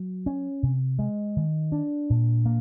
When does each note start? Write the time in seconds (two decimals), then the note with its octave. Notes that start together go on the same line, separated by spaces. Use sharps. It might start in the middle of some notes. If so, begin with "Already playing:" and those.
Already playing: F#3
0.26 C#4
0.63 C3
0.99 G#3
1.36 D#3
1.72 D4
2.10 A#2
2.46 A#3